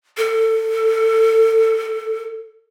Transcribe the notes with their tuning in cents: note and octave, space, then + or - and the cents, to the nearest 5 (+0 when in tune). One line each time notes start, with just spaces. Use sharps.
A4 +20